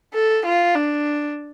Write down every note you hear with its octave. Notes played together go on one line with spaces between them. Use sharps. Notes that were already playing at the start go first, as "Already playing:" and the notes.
A4
F4
D4